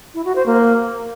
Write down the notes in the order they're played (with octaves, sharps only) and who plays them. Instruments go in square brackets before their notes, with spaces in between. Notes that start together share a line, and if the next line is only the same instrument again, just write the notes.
[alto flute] E4
F#4
C5
A#3